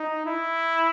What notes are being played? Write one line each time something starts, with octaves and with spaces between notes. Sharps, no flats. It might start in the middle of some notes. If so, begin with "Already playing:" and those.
Already playing: D#4
E4